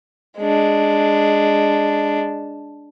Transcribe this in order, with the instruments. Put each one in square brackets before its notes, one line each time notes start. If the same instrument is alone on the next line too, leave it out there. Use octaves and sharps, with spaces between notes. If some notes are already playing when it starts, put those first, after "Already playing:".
[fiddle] G#3 D4